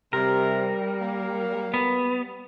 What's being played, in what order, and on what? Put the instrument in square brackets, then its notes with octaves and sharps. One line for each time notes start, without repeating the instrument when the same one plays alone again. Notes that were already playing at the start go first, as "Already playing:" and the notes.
[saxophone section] C3 [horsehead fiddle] G3 [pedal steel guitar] A#4
[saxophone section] A#3
[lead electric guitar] B3